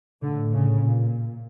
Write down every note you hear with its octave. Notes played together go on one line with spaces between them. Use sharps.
A2 D3
C#3
A#2